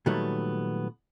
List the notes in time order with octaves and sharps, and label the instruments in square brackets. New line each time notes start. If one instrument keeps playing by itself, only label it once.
[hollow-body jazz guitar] A#2 D#3 F#3 G3 A3 B3